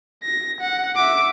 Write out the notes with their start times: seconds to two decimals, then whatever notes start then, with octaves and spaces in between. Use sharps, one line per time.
0.23 A#6
0.60 F#5
0.96 E5 D6